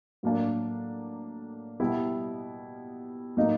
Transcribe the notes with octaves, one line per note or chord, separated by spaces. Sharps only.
A2 F#3 A#3 D4
B2 G3 B3 E4
A2 F#3 A#3 D#4